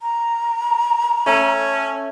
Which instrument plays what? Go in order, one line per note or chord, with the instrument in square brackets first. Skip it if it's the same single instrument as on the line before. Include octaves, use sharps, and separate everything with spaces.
[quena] A#5
[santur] A3 [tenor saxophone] C#4